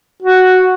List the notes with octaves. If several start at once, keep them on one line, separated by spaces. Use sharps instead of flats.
F#4